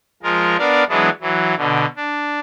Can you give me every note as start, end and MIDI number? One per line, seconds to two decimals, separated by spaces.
0.23 0.57 53
0.23 0.57 56
0.23 0.57 65
0.23 0.57 70
0.58 0.84 59
0.58 0.84 62
0.58 0.84 70
0.58 0.84 74
0.58 0.84 77
0.89 1.10 52
0.89 1.10 54
0.89 1.10 56
0.89 1.10 59
0.89 1.10 62
1.21 1.55 52
1.21 1.55 54
1.57 1.86 47
1.57 1.86 50
1.97 2.40 62